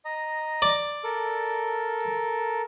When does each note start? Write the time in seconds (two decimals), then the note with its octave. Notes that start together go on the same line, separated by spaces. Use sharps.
0.05 D#5 A#5
0.62 D5
1.04 A4 A#4